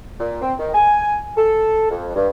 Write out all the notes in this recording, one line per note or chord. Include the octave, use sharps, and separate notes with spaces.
A#2
C4
D#3
G#5
A4
F2
G2